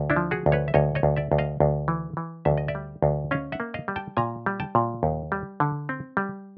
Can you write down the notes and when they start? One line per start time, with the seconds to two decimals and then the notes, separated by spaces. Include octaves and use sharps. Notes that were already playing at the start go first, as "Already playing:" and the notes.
Already playing: D2
0.10 D4 E4
0.16 F3
0.31 F#4 G#4
0.46 D2
0.52 B4 C#5
0.68 E5
0.74 D2 C#5 D#5
0.95 C#5 D#5
1.03 D2
1.16 D5 E5
1.32 D2
1.38 D#5 F5
1.60 D2
1.88 E3
2.17 E3
2.45 D2 E5
2.58 D#5
2.68 D5 E5
2.75 G3
3.02 D2
3.31 C#4 D#5 F5
3.52 E5 F#5
3.60 A#3
3.74 D#5 F5
3.88 G3
3.96 G5 A5
4.17 A#2 G#5 A#5
4.46 G3
4.60 G5 A5
4.75 A#2
5.03 D#2
5.32 G3
5.60 D3
5.89 C4
6.17 G3